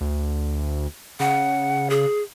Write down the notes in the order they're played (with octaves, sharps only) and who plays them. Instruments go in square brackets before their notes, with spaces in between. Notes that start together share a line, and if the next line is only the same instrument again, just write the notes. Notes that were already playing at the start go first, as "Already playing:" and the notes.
[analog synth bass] D2
[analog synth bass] C#3 [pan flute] F#5
[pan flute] G#4